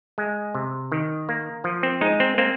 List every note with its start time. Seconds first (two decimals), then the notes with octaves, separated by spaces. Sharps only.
0.18 G#3
0.55 C3
0.92 D#3
1.29 A#3
1.64 F3
1.83 C4
2.01 G#3 D#4
2.20 C4
2.38 A#3 C4